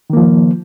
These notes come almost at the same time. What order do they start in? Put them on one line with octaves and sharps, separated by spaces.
D#3 A#3 F3